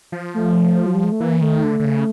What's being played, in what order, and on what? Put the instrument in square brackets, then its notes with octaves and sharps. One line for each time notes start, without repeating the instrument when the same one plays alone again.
[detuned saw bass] F3
[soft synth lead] A3
F#3
G3
G#3
A3
[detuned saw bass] E3 [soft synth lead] A#3
[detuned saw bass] D#3 [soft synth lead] A3
[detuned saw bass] D3
D3
C#3